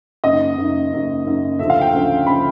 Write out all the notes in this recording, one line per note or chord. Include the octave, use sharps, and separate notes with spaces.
F#1 F#2 D#3 D#5
F#1 F#2 D#3
F#1 F#2 D#3
F#1 F#2 D#3
D2 C#3 F3 E5
F5
G5
D2 C#3 F3
C#3 F3 B5